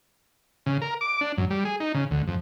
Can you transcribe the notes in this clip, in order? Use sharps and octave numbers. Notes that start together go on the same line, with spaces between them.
C#3
A#4
D6
D4
F#2
G3
G#4
D#4
C#3
D2
F2